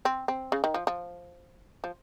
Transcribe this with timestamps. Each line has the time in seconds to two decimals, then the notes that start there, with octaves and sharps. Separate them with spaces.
0.05 C4
0.28 C4
0.52 C#3
0.64 D#3
0.74 F3
0.87 F3
1.84 F3